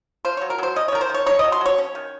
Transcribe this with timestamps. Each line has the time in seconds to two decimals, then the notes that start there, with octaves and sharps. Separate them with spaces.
0.25 F4 C5
0.37 C#5
0.41 F#3
0.50 A#4
0.58 F#3 C5
0.76 C#4 D#5
0.88 C#5
0.92 D#3 A#4
1.01 C5
1.10 D#3 C#5
1.26 D#4 C#5
1.39 D#5
1.44 F#3
1.52 C6
1.61 F#3 C#5
1.78 C#4
1.95 D#3